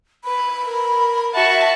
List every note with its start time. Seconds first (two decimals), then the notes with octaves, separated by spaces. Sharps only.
0.24 B4 B5
0.64 A#4
1.34 F#4 E5 A5